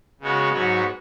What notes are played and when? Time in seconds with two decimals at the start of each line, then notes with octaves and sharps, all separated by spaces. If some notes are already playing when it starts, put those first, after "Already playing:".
0.20 C#3 G#3 B3 F#4 C#5
0.52 G#2 F#3 B3 F#4 C#5